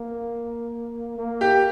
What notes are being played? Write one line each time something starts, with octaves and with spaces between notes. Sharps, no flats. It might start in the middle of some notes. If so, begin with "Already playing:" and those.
Already playing: A#3
A#3
G4